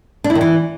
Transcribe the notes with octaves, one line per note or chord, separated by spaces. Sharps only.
D4
E4
D#3
E3